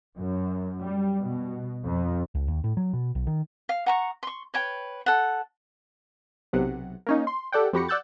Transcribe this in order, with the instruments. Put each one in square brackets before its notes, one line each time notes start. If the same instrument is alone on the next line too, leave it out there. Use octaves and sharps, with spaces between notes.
[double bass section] F#2
G3
B2
F2
[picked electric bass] C#2
D#2
A2
F#3
B2
B1
D#3
[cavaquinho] F5
F#5 A#5 C#6
C6 C#6
B4 C#5 G5
A4 F#5
[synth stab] B1 C3 F#5
A#3 C#4 D#4
C6
G4 A4 D5 F#5 G5
F2 F#4 G4 B5 A#6 C#7
D5 F#5 E6 F#6 G6 A6